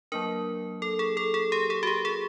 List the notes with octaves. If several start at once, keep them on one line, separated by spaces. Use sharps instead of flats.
F#3 A#3 D4 A#4
A4
G#4
A4
G#4
G4
G#4
F#4
G4
G#4